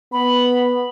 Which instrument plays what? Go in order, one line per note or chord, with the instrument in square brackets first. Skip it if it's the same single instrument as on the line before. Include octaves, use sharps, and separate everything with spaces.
[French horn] B3 [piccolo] B5